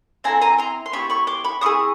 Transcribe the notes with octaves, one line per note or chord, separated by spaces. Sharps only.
C4 E4 A4 G#5 A#5
G#5 A#5
A#5 C6
C6
B3 E4 G4 B5 C#6
B5 C#6
C6 D6
B5 C#6
C4 E4 G#4 C#6 D#6